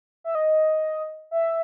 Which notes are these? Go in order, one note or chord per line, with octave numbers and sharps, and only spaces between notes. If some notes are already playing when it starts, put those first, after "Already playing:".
E5
D#5
E5